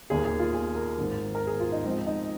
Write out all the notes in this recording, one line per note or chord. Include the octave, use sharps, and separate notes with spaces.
D#2 D#3 A#3 G#4
G#4
F4
G#4
A#4
G#1 G#2 D#3
A#4
G#4
F4
D#4
G#2 F3 C4
D#4